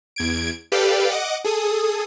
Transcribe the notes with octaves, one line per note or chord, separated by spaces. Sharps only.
E2 G#6 D7
G4 A4 B4 D5 F5 G5
D#5 F#5 D6
G#4 A4 D#6